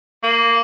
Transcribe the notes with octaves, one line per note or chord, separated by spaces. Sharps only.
A#3